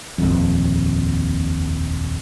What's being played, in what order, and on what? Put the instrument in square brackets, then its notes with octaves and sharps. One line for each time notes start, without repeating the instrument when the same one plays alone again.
[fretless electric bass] D#1 A#1 F2